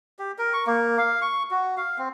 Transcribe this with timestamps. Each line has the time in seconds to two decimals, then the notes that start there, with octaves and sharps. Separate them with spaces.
0.19 G4
0.38 A#4
0.53 C#6
0.66 A#3
0.98 F5
1.22 C#6
1.51 F#4
1.77 F5
1.98 C4